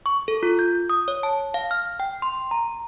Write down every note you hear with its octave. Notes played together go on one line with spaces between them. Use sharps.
C#6
A4
F4
G6
D#6
C#5
A5
F5
F6
G5
C6
A#5